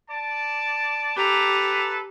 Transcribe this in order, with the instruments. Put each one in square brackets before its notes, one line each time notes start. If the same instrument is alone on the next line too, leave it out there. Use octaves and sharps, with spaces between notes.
[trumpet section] D5 A5
[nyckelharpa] G4 A#5 [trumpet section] A4 B4